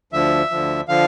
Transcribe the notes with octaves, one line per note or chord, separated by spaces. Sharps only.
D2 D3 F3 E5
D2 D3 F3
D3 F3 F5